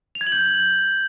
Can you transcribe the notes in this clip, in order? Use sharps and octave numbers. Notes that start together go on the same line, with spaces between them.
F7
G#6
F#7
G6